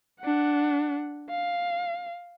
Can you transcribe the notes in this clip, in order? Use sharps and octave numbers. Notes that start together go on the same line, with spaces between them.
D4 F#5
F5